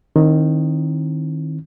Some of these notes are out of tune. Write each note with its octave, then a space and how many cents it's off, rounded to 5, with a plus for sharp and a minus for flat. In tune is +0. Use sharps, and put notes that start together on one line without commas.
D#3 +0 C4 +35 E4 +0